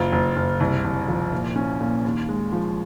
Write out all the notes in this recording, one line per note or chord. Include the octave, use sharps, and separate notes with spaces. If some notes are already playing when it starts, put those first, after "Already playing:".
Already playing: F#1 F4
F#1
F#1
C2
C2
F3
A#2
C#4
A#2
D#2
G#3
F3